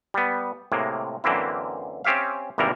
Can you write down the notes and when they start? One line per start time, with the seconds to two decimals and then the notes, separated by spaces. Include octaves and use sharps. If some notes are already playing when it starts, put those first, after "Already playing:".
0.14 G3 B3
0.72 A2 C3 G#3 A#3
1.24 F#2 D3 E3 A#3 C4 E4
2.04 C4 C#4 G4 E5 F5
2.58 G#1 C3 E3 G3 A#3 A#4